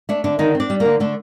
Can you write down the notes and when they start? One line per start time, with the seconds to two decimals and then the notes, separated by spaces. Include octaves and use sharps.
0.09 A3 D4
0.24 D3 D4
0.39 D3 D#3 D#4
0.55 C4
0.60 D4 D5
0.70 G3
0.80 A#3 A#4
0.85 D3
1.00 D3 A3 A4